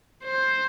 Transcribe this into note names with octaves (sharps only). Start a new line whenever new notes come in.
C5